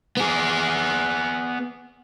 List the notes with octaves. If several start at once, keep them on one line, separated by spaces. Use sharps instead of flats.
B3 G#4